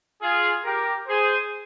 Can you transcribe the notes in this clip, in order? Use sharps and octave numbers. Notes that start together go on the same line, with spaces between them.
F4 G#4
G4 A#4
G#4 C5